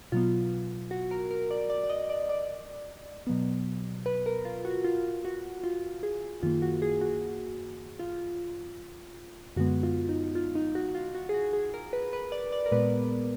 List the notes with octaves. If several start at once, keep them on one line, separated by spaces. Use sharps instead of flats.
B2 F#3 B3 F4
F#4
A#4
A#4
D5
D5
D5
D#5
D5
D5
B2 F#3 B3
B4
A#4
F4
F#4
F4
F#4
F4
G#4
F#2 D#3 A#3 F4
F#4
G#4
F#4
F4
F#2 D3 G#3 B3 F#4
F4
D#4
F4
D#4
F#4
F4
F#4
G#4
F#4
G#4
A#4
B4
B4
D5
D5
A#4
A#2 G#3 B3 B4